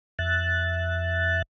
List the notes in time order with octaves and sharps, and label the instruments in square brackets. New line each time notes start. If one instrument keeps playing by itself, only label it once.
[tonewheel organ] F2 E5 F#6 A6